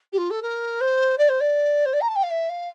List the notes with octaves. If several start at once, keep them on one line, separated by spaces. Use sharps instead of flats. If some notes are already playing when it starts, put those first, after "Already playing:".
G4
F4
A4
A#4
C5
D5
C5
D5
C5
D5
A#5
A5
G5
F5
E5
F5